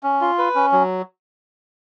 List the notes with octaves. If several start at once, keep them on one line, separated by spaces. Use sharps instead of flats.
C#4
F4
B4
C#4
F#3